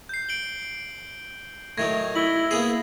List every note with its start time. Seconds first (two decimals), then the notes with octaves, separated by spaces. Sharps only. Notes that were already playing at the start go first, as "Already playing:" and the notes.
0.09 G6 C7
0.29 D7 F#7 G7
1.78 A2 D#3 F#3 G#6 A#6
2.16 E4 F#7 G7
2.51 A#3 B3 G#4